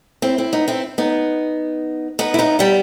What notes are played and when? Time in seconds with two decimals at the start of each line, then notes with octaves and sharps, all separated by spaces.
0.22 C4 E4
0.38 C4 E4
0.53 B3 D#4
0.68 C4 E4
0.98 B3 D#4
2.19 B3 D#4
2.34 E4
2.39 B3 D#4
2.59 G3 B3